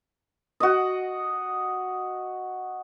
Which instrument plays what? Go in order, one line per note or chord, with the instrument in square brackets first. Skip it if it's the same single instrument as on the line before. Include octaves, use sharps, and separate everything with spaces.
[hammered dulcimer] F#4 D#5